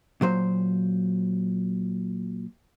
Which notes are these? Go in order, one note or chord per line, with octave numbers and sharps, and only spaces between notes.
A#2 F#3 C5